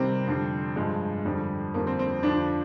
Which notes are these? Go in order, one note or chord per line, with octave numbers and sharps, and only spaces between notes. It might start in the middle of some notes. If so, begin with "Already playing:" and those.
Already playing: C3 D#3 G3 C4
F2 D3 G3
G2 F3 G#3
F2 D3 G3
F2 D3 G3 A#3
C4
C4
F2 D3 F3 D4